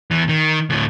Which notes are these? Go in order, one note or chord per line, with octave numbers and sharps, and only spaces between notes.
E2 E3
D#3
D2 A2